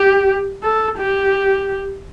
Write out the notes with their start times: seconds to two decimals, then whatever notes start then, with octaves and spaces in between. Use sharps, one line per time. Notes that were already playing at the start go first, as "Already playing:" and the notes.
Already playing: G4
0.63 A4
0.98 G4